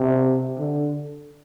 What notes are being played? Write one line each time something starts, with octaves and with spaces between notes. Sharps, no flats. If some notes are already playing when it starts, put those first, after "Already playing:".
Already playing: C3
D3